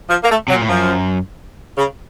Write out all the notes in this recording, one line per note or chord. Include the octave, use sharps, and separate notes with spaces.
F3
A#3
A3
C3 F#3
A#2
A2
F#2 F3
C#3